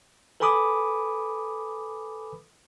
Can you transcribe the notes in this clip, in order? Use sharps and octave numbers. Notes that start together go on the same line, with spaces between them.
A4 B4 G#5 B5 D6 D#6